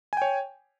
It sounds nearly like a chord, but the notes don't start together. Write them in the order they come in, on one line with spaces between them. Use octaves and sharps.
G#5 G5 C#5